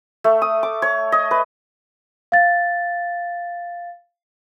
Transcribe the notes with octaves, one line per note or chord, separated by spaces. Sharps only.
A3
D#6
D6
C#5
D#5
B4
F5 A6